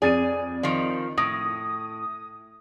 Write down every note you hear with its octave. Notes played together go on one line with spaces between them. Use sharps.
F2 G#4 D5 A6 D#7
D#3 F3
A2 D#6 A#6